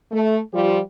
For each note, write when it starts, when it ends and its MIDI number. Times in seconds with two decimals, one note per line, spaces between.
0.12 0.38 57
0.54 0.79 53
0.54 0.79 55
0.54 0.79 65
0.54 0.79 67